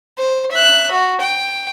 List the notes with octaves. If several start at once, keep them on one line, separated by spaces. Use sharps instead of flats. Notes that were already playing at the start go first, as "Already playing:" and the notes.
C5
E5 F#6
F#4
G5